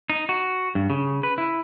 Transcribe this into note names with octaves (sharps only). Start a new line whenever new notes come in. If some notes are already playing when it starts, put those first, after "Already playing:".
D#4
F#4
G2
C#3
B4
E4